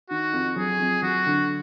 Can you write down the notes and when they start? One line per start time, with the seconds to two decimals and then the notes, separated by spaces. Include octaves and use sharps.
0.10 D#3 F#4
0.33 F2
0.56 F#3 G#4
0.79 F2
1.02 F#3 F#4
1.26 D3